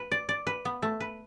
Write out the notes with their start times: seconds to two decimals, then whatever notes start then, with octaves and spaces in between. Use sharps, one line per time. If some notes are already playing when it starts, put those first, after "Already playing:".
Already playing: B4
0.12 D5
0.29 D5
0.47 B4
0.65 B3
0.82 A3
1.00 B4